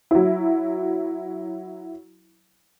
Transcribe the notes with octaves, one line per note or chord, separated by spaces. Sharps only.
F#3 E4